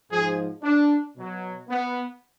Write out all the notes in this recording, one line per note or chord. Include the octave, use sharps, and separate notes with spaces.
G#2 F3 G#4
D4
B2 F#3
B3